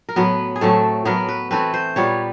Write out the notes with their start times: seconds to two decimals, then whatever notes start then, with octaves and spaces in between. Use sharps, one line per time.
0.09 A#4
0.16 A2 F#3 B3 B4
0.56 G#4
0.61 A2 F#3 A3 C4 A4
1.05 A2 F#3 B3 A#4
1.29 B4
1.51 E3 A3 C4 B4
1.74 C5
1.96 A#2 G3 B3 C#5